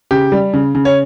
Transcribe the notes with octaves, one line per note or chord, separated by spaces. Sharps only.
C#3 G4
G3
C#3
C#3
C#5